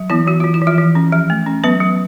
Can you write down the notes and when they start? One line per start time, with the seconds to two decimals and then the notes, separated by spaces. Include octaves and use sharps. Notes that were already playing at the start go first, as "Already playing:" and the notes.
Already playing: F#3
0.10 E3 B3 E4
0.27 E3 F#4
0.40 E3 F4
0.54 E4
0.61 E3
0.67 F3 F4
0.78 E3
0.95 C#4
1.12 F3
1.30 A3
1.47 C#4
1.64 F#3 B3 B4
1.81 F#3